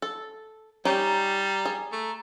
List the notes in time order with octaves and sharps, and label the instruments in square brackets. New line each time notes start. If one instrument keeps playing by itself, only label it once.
[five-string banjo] A4
[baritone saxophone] G3 [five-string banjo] C#4 D#4 G4 [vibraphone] A#5
[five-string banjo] G#4
[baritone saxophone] A3